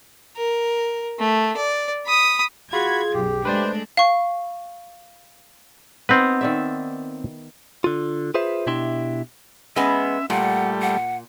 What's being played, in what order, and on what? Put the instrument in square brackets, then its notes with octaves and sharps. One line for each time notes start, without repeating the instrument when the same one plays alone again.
[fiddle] A#4
A3
D5
B5 D#6
[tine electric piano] F4 [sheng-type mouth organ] F#4 B5 [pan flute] G#4 [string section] G#6
[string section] B1 F#2 [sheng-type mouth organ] G4
[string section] G#3 A3 D4 [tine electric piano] B4 C5 D5
[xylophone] F5 C#6
[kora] B3 D#4 [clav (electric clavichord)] C4 B4
[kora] D#3 D5 E5
[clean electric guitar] D3 F4
F4 G#4 B4 C5 E5
B2 D4 E4 G4 E5 C6
[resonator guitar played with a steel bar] G#3 B3 [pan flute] C#4 [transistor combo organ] E5
[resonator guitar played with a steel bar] A#2 [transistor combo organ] G3 A3 [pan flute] F#5
[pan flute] F#5